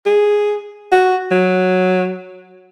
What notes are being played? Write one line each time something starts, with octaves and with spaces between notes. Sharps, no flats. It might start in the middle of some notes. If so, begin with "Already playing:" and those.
G#4
F#4
F#3